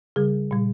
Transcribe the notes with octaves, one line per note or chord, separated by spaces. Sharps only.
C#3 G3 G#4
A#2 G3